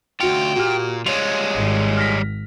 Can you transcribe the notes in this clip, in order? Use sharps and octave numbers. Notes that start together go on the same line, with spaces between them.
D2 F4 F#4 G5 C#7
A#2 F#4 G4 F6
G3 G#3 F4 C#5 F7
G#1
F6 A#6 B6